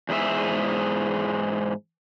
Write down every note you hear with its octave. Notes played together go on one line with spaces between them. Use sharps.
E2 G#2 G#4 E5